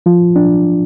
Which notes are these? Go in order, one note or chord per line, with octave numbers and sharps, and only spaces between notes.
F3 F4
D4